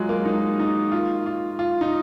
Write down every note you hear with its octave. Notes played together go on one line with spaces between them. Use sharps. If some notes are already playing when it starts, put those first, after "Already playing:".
Already playing: F#3 G#3 F4
A#3
D#4
D#4
F4
F4
F4
D#4